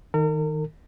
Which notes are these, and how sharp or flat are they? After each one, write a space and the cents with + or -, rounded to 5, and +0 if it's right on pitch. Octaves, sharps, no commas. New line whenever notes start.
D#3 +10 A#4 -40